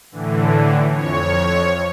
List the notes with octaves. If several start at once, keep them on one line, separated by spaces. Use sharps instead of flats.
A2 D3 E3
F2 C#5